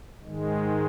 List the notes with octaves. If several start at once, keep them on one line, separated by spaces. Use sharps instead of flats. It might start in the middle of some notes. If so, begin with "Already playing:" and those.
G#2 D#3 G#3